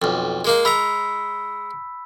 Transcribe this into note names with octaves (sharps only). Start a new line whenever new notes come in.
B1 F2
G#3 A#3 D#4
G#3 A#5 B5 E6 B6